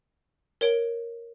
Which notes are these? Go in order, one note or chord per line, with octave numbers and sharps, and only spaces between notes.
A#4 C#5 D7